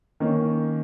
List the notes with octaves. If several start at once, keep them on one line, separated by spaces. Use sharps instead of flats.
D#3 A#3 C#4